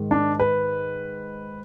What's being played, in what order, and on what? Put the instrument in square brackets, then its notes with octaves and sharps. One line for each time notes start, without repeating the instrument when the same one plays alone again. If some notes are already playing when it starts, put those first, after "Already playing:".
Already playing: [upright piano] G#2 D#3 G#3
D4
B4